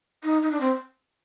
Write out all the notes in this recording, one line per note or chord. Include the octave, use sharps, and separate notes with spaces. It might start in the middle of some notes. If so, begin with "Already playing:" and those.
D#4
D#4
D4
C4